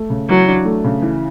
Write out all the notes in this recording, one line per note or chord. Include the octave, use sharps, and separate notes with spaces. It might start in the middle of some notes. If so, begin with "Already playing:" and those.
Already playing: A3
C#3
E3 F#3
D4
A3
C#3
E3